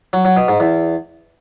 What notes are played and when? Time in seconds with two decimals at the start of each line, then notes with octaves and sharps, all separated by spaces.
0.13 F#3
0.25 F#3
0.37 B2
0.48 G#2
0.60 E2